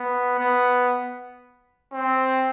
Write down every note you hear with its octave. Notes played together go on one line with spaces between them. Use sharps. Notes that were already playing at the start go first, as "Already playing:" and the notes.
Already playing: B3
B3
C4